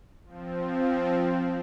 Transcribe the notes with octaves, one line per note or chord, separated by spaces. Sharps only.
F3 C4